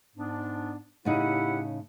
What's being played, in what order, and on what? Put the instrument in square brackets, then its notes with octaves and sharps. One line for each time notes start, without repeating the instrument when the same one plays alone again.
[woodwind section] G#2 B3 D4
[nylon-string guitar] A2 C#3 D#4 [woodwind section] E4 G4 F#5